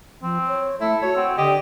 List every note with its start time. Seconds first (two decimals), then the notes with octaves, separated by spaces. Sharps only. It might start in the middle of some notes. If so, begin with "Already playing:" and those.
0.22 F3 C4
0.47 C#5
0.81 A3 E4 A4
1.03 F#4 C#5
1.16 C4 F#5
1.38 D3 G4 D#5